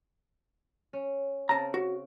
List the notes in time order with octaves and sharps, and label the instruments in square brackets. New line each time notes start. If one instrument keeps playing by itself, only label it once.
[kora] C#4
[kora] C#3 C4 [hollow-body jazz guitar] A5 A#5
[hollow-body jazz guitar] F#4